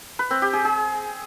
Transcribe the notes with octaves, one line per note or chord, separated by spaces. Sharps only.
B4
C4
G4
G#4
G#4